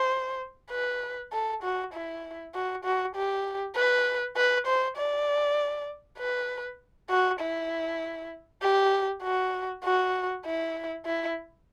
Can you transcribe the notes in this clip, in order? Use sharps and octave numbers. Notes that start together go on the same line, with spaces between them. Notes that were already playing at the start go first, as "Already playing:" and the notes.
Already playing: C5
B4
A4
F#4
E4
F#4
F#4
G4
B4
B4
C5
D5
B4
F#4
E4
G4
F#4
F#4
E4
E4